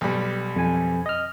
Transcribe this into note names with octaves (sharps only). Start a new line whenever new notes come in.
B1 G3
F2 G#5
D#5 F6